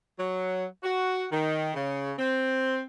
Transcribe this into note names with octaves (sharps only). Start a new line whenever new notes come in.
F#3
F#4
D#3
C#3
C4